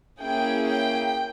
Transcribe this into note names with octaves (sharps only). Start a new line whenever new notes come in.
A#3 C#4 E4 G#4 G5
G5